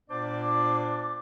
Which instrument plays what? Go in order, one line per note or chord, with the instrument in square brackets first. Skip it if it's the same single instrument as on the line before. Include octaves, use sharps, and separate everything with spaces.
[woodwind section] A#2 B3 D4 C5 D5 D6